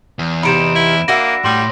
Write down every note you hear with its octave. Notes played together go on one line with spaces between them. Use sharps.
E2
C3 D#4 B5 D7 E7
E4
A#3 D4 F#4 E5 A#6
A2 G3 C6